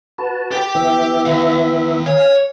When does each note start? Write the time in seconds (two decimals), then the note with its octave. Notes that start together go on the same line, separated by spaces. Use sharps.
0.18 F#4 B4 A5
0.51 G4 G5
0.75 E3 B3 E5
1.25 D#3 F5
2.06 C#5 F5 G#5